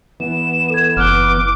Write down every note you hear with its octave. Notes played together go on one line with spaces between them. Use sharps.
E3 B3 E7
A4 G#6
F#1 D6 F6 F#6 G7